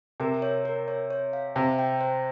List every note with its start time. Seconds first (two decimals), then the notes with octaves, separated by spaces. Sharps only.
0.20 C3 A#4
0.42 C#5
0.65 A#4
0.88 C#5
1.11 C#5
1.33 F5
1.55 C3 C5
1.79 G5
2.01 C5